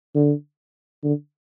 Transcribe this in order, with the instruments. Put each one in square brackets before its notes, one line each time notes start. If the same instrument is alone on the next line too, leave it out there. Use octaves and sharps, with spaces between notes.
[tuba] D3
D3